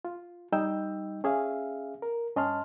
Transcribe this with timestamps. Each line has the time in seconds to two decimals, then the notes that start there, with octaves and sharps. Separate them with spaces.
0.05 F4
0.52 G3 D#4 D#5 G5 E6 G6
1.24 C#4 G#4 E5 F5
2.02 A#4
2.36 G2 C#4 D#5 A5 C6 F6